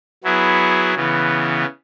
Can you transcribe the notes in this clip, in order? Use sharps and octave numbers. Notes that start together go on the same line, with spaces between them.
F#3 B3 E4 G#4
C#3 E3 B3